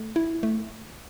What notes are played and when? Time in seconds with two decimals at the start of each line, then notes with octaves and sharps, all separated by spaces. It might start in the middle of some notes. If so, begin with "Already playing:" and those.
Already playing: A3
0.16 E4
0.43 A3